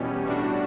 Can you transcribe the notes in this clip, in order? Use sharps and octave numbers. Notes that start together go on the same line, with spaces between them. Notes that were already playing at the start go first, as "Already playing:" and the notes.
Already playing: E2 B2 G3 C#4
A2 G3 D4 F#4